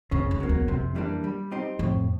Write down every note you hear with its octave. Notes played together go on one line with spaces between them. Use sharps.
F2 C#3
F2
F#3 A#3
E2
F2 C3
E3 G3 A#3 D4
G3
C4 D#4 G4
F2 A2